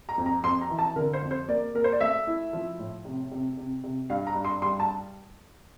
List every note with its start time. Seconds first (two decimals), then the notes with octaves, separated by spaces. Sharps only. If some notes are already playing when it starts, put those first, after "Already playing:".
0.09 A#5
0.18 F2
0.26 A#5
0.43 F2 C6
0.61 A#5
0.70 E3
0.79 A5
0.96 D3 A#4
1.13 C5
1.22 F2
1.31 C5
1.48 A#3 D5
1.74 A#3 A#4
1.84 C5
1.92 D5
2.00 A3 E5
2.27 E4
2.53 F3
2.79 A2
3.05 C3
3.31 C3
3.57 C3
3.84 C3
4.10 G2 F5
4.27 A#5
4.35 G2
4.45 C6
4.62 G3 C6
4.80 A5